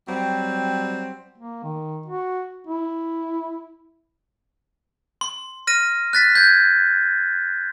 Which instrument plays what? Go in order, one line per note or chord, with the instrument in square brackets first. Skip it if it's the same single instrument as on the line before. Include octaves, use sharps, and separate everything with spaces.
[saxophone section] F#3 G3 C4
[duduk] A#3
D#3
F#4
E4
[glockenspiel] C6
F6 A#6 D#7
F#6 A6 B6
G6 G#6